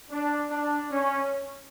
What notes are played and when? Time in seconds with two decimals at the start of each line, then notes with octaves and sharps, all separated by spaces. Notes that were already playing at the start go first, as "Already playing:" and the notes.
0.11 D4
0.51 D4
0.91 C#4